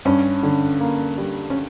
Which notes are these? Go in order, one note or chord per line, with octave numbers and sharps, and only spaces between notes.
G2 C#4
D3
A#3
G3
C#4